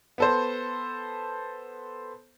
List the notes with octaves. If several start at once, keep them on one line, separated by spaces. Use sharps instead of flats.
B3 A4 C5